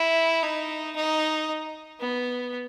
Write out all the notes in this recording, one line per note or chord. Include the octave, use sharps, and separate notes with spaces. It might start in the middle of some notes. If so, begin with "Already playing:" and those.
Already playing: E4
D#4
D#4
B3